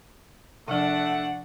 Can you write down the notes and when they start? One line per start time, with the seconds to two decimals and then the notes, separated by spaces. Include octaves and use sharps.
0.68 C3 F3 A3 D4 F#5